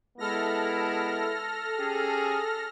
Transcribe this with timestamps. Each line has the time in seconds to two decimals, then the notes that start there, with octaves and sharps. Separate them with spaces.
0.18 G#3 B3 E4 A4 F6 A#6
1.79 C#4 G4 G#4